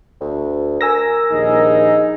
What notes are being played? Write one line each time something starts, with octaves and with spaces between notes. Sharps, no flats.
D2
A#4 G#5 E6 A#6
A#1 D#2 D#4 G#4